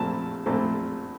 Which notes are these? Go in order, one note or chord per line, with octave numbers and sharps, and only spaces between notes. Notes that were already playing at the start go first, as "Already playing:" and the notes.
Already playing: A#1 A#2 A3 C4 A5
A#1 A#2 A3 C4